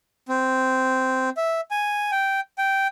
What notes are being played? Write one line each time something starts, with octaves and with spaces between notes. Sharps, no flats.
C4
E5
G#5
G5
G5